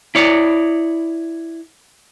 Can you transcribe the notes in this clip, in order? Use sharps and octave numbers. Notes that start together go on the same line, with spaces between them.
E4 C#5 D5